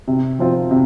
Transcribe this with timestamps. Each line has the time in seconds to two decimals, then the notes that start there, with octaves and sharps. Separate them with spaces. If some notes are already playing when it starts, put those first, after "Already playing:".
0.08 C3
0.39 F3 C4 F4
0.71 C3